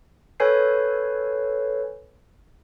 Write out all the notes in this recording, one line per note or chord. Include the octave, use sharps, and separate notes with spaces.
A4 B4 C#5 G#5 G6 C7